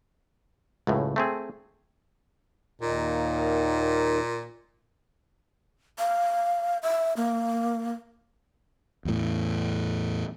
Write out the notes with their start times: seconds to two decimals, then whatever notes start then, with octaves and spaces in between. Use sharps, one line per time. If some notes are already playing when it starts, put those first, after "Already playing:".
0.87 C#2 F#2 A2
1.16 A3 C4 G#4
2.81 D#2 A#2 D#3 D#4
5.99 F5
6.83 E5
7.17 A#3
9.05 E2 A2